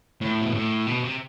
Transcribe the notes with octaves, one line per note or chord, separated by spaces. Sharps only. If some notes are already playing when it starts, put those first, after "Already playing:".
A2
B2
A2
B2
C3